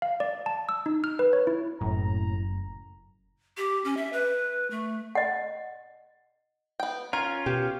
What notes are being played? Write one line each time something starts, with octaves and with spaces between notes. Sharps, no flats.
F5
D5
A5
E6
D#4
F6
B4
C#5
E4
F#1 F#2 A2 A#5
G4
C#4
E5
B4
A3
D#5 F#5
B3 G5
C#4 F4 A#4
B2 G4